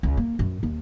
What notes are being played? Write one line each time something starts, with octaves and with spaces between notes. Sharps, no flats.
C#2
A#3
F#2
D#2